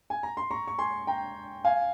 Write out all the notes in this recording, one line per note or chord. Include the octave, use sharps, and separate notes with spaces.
G#5
A#5
C6
A#5 C#6
C#6
G#5 C6
G5 A#5
F5 G#5